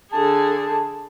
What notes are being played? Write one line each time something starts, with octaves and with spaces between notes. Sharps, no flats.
D3 G#4 A5